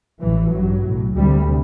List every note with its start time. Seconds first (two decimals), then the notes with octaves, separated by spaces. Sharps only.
0.22 A1 A2 E3
0.53 A1 G2 F#3
0.84 B1 A2
1.14 D2 C3 G3